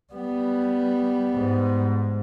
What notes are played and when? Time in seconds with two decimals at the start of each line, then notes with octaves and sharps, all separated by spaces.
0.13 G3 B3
1.34 G#2